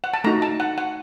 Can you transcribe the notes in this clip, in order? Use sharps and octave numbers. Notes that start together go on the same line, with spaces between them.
F#5
A5
A3 D#4 F#4 A#5
A5
F#5
F#5